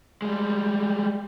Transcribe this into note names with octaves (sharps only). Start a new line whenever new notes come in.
G3 G#3